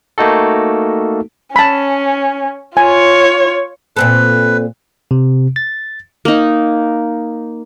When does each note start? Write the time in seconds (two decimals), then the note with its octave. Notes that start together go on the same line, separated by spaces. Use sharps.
0.18 A3 A#3 D#4 F#4 A4
1.56 C#4 A5 B5
2.77 F4 C#5 G#5
3.97 A#2 C4 A4 B4
5.11 C3
5.56 A6
6.25 A#3 D#4